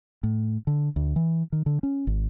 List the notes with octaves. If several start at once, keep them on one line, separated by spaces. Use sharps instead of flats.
A2
D3
D2
E3
D#3
D3
C#4
G#1